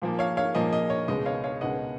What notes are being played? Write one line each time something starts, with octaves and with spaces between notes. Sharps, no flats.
A#2 F3 A#3
C#5 F5
C#5 F5
A#2 F3 A#3 D#5
D#5
C#5
C#2 B2 G#3 D#5
C#5 F5
C#5 F5
C#2 B2 G#3 D#5 F#5